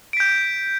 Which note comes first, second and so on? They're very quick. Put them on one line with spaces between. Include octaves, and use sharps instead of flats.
D7 B6 G6